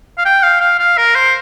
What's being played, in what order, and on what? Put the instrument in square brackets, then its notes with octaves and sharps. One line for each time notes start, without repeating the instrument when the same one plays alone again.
[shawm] F5
G5
F5
F5
F5
A#4
C5